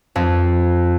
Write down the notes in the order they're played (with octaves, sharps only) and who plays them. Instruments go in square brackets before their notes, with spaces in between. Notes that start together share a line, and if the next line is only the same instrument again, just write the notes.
[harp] F2